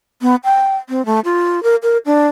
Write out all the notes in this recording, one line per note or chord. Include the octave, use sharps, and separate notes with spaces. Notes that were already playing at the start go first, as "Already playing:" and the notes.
B3
G5
C4
A3
F4
A#4
A#4
D4